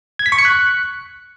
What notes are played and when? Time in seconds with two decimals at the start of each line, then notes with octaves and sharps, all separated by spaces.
0.19 G#6
0.26 B6
0.32 C#6
0.39 C#7
0.45 F#6